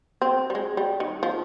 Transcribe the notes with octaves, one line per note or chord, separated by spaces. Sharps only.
C4
G3
G#3
G3
D#3
F3